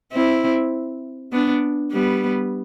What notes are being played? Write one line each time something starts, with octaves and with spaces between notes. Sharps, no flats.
C4 E4
B3 D4
G3 B3